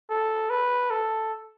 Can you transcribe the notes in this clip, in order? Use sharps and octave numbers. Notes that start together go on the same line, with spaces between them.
A4
B4
A4